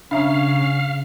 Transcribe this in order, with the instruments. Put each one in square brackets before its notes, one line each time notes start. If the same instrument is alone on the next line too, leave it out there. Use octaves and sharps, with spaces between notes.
[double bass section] C#3 [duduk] C#4 [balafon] D4 E5 A#5 [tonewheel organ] F5